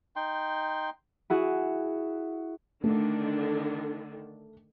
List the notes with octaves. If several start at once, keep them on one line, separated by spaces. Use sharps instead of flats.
D#4 G5 C6
E4 F#4 G#4
D3 D#3 A3 D4